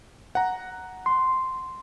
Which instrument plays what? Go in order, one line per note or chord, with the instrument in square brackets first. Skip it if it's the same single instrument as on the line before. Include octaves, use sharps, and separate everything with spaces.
[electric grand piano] F#5 A#5
[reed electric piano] C6